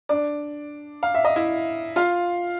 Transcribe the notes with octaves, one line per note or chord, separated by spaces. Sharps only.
D4 D5
F5
E5
D#5
E4 E5
F4 F5